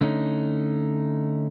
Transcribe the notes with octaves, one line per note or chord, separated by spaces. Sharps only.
D3 A3 C#4 D#4